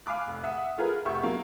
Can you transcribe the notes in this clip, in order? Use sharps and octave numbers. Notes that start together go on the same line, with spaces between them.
F5 G#5 B5 D6 F#6
F1
E5 F#5 D#6
A3 F4 G#4 A#4 B4
F1 G4 E5 F#5 C#6 G6
F#3 A#3